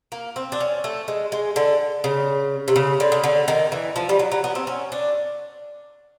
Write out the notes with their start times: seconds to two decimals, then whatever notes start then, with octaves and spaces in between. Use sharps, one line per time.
0.12 A#3
0.36 C4
0.52 D4
0.61 C#4
0.84 A3
1.08 G#3
1.32 G#3
1.56 D3
2.04 C#3
2.68 C3
2.76 C#3
3.00 D3
3.12 C#3
3.24 D3
3.48 D#3
3.72 E3
3.96 F3
4.09 G3
4.19 F#3
4.32 F#3
4.44 B3
4.55 C4
4.67 C#4
4.92 D4